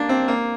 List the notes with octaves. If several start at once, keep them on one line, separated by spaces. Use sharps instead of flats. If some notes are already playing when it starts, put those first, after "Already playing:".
Already playing: A#3 D4
C4
A#3